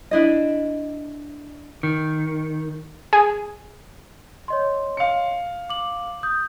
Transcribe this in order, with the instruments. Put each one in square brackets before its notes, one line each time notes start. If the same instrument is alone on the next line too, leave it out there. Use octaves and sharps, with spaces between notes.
[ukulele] D4 E4 D#5
[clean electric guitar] D#3
[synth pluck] G#4
[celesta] C#5 D#5 C6
[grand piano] F5 C#7
[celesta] D6 F#7
D#6 G6